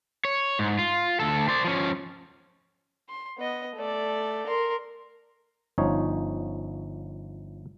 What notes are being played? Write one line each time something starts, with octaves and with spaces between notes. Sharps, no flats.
C#5
G#2
F4
D2 A4
C5 D5
F3 C#4
C6
B3 D#5
A3 D5
A#4 C6
G1 F3 C#4 D#4 C#5